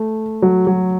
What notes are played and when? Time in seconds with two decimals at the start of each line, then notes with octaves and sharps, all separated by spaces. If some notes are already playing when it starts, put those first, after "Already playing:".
Already playing: A3
0.42 F#3
0.67 F#3